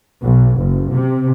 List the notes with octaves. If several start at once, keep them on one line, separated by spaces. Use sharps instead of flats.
B1
F#1
C3